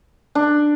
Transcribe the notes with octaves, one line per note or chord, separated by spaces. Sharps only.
D4